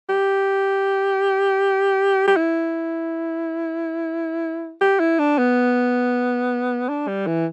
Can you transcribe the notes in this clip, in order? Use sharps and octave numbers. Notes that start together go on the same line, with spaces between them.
G4
G4
E4
G4
E4
D4
B3
D4
G3
E3